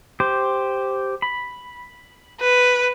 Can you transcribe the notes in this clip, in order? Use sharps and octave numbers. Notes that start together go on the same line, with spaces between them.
G4 C5
B5
B4